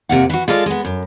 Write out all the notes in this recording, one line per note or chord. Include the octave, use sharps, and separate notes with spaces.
F2 C3 A#3 F#5
E3 F#4
G#3 F4 A4 C#5 D5
G#3 B3
F#2